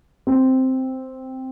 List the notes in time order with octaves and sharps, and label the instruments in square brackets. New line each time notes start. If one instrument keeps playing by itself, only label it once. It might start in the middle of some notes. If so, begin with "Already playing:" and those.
[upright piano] C4